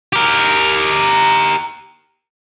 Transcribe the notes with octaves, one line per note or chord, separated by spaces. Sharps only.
G4 A#4